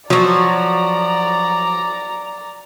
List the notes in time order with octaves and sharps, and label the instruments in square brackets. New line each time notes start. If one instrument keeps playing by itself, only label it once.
[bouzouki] F3 F#4 [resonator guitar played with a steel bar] F#3 [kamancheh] D5 A#5